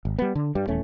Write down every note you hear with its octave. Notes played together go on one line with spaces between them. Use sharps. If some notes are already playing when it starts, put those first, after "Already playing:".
G#1
G3 B3
D3
G2 G3
D#1 E2 A3 C#4